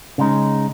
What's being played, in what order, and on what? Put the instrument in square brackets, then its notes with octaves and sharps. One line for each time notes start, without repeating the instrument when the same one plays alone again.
[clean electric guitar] C#3 G#3 D#4